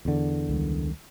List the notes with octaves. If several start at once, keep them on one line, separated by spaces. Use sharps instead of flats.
E2 D3
C#2 D#3 G3